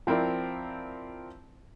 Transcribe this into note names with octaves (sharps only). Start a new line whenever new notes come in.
F3 C4 E4 A#4 D5